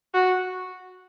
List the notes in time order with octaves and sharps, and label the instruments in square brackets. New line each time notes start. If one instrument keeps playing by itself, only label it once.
[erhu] F#4